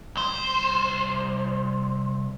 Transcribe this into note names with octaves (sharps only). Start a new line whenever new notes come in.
C2 C5